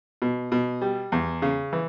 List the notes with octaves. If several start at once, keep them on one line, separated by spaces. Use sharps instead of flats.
B2
B2
G3
E2
C#3
E3